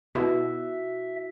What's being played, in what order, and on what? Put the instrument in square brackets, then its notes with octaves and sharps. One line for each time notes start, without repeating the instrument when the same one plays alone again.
[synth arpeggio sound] B2 [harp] E4 F#4 [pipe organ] E5